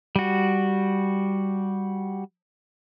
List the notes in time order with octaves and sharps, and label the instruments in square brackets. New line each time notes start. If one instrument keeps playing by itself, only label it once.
[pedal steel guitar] G3 F#4